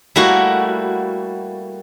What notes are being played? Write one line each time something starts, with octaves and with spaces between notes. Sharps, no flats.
G3 A3 A#3 E4 F#4